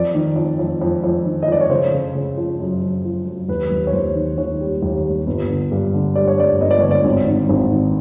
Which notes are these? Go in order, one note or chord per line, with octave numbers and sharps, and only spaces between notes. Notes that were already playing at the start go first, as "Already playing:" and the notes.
Already playing: F2 D5
D#3
F2
F2
F2
F2
D#3
D#5
F2 D5
C#5
C#3 C5
C#3
C#3
F3
F#2
F#2
F3
F#2
D#2 B4
D#2
C#5
D#2 C5
D#3
D#3 C#5
G3
D#2
G3
G1
D3
G2
D3
G3 D5
C#5
G2 D5
G1 D#5
D5
D3 C#5
D5
G#1
D#3
G#1
D#3